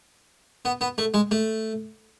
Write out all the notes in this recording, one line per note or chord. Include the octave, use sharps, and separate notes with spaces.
B3
B3
A3
G#3
A3